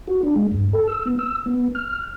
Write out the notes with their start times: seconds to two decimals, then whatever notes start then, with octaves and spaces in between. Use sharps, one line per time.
0.07 F#4
0.23 D4
0.36 G#3
0.52 G2
0.73 A4
0.88 E6
1.06 B3
1.19 E6
1.46 B3
1.75 F6